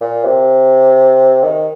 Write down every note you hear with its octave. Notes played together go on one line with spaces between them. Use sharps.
A#2
C3
D#3